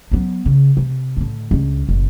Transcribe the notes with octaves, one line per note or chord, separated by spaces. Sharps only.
F#3 B3
C#3
C3
A2 D3
C#2 D3
F#1 B2